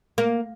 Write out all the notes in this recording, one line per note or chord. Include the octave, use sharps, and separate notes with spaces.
A#3